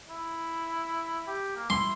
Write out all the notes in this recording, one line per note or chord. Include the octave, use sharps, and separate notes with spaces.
E4
G4
A#3
E4 C6